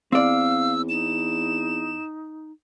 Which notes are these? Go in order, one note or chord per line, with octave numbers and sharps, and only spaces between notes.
E2 C4 D5 F5 E6
D#4 E7